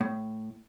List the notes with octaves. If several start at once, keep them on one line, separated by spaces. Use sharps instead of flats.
A2